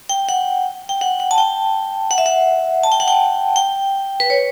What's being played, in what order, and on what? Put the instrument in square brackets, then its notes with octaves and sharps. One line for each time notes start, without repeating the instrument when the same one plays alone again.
[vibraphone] G5
F#5
G5
F#5
F#5
A5
G5
F#5
E5
F#5
A5
G5
F#5
G5
G5
B4
C#5